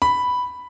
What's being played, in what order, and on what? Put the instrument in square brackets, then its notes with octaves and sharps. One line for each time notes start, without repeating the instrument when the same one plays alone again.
[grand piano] B5